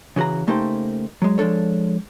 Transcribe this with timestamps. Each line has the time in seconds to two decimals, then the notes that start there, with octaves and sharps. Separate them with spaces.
0.16 C#3 E3 F#4 G#4 A#5
0.47 C#3 A3 A#3 D#4 G4 C5
1.22 F#3 G#3
1.38 F3 G#3 D4 A4 C#5